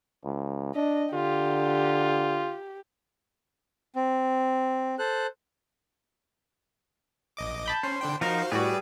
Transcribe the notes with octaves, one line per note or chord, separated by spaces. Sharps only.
C#2
D4 D#5
D3 F4 G4
C4
A4 C5 F#6
A#1 D#5 D6
A5 B5 G6
C#4 C5
D3 D4 G5
F3 D#4 F#4 A#4 C5 F5
A2 G3 F#4 G#4 B4 D5